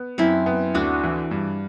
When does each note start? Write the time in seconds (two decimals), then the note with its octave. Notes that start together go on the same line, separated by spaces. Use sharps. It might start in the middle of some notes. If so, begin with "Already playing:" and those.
Already playing: B3
0.18 F#2 C4 E4
0.46 B3
0.74 D2 D4 F#4
1.03 E3
1.31 G2